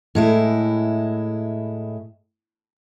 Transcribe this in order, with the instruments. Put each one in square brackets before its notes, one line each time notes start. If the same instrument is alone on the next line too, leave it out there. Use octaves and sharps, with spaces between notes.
[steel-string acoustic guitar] A2 G#3 E4